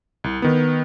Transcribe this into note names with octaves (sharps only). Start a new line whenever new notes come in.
C2
D#3 B3